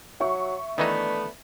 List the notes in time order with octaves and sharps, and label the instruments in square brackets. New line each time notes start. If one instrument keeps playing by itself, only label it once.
[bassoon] F#3 [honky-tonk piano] E5 C#6
[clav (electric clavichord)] D#3 E3 D#4 [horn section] A3 B3 [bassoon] D4